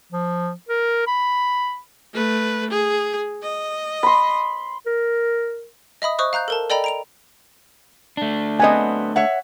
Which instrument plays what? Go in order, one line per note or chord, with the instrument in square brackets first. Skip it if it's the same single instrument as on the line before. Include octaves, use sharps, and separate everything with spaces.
[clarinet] F3
A#4
B5
[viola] A3 B4
G#4
D#5
[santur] B5 C6
[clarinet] A#4
[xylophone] D#5 E5 B5 D#6
C5 D#5 C#6 D#6 F#6
F5 A#5 F#6 G6
A4 A#4 A5
A4 D5 D#5 G5 A#5 B5
A#5 D7 F7
[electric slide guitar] A3 D4
[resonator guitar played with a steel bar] F#3 B3 C4 [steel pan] D#5 G#5
[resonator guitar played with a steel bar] C#5 E5 F#5